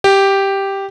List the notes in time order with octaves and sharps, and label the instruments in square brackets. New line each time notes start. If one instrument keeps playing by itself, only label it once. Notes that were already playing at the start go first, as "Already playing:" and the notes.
[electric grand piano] G4